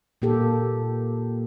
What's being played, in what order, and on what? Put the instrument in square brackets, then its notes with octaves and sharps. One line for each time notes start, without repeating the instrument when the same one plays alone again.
[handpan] A#2 A#3 G4 A4